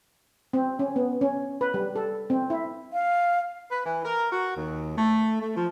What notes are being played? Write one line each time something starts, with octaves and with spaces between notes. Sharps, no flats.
C4
C#4
B3
C#4
B4
G3
A4
C4
E4
F5
B4
E3
A#4
F#4
D#2
A3
A3
F3